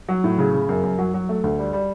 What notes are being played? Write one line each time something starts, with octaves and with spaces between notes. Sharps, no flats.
F#3
A2
C#3
C#3
F#2
F#2
F#3
F#3
A3
D2
G3
G3